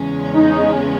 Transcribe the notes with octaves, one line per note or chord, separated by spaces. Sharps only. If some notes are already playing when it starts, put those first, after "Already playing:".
Already playing: E2 C#3 G#3 C#4
D#4